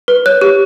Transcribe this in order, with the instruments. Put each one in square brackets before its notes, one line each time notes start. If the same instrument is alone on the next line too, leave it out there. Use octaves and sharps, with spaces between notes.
[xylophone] B4
C#5 F#6
G4